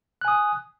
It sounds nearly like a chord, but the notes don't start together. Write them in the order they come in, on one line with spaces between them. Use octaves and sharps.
F#6 G#5 D#6